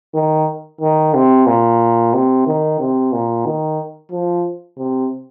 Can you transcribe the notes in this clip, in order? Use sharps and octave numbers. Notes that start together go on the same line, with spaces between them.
D#3
D#3
C3
A#2
C3
D#3
C3
A#2
D#3
F3
C3